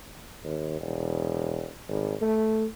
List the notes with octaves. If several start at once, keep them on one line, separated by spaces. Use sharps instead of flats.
D#2
E1
G#1
A3